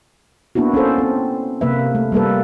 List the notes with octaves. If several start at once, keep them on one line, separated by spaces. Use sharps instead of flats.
A#3 B3 D4 E4 F#4
C#4 D4 A4 C5
C4
C3 A#3 B4 E5
A3
G3 A3 A#3 A4 B4